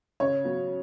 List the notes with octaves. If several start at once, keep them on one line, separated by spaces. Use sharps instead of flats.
C#3 C#5
F#3 B3